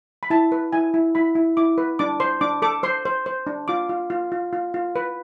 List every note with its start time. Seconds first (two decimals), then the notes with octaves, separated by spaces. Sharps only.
0.23 B5
0.30 E4 A5
0.52 B4
0.73 E4 G#5
0.94 E4
1.15 E4 B5
1.35 E4
1.57 E4 D6
1.78 B4
1.99 D4 D6
2.20 C5 C6
2.41 D4 D6
2.62 A4 D6
2.83 C5 C6
3.05 C5
3.26 C5
3.47 D4
3.68 F4 D6
3.89 F4
4.10 F4
4.32 F4
4.53 F4
4.74 F4
4.96 B4